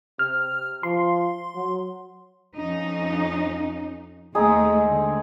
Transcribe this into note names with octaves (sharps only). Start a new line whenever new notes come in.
C3 F6
F3 C6
F#3
F2 C#4 D#4
D#2 G#3 A3 C4 D#4 G#4
D3